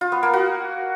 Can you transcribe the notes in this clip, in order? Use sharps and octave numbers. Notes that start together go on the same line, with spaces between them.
F4
B3
A#3
F#4